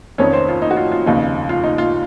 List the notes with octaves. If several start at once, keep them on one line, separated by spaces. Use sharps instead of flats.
F1 F2 D#3 C#4 C#5
C4 C5
F4
D#4
F#4
F4
F4
F1 D#2 C#3 D#4
F4
D#4
F4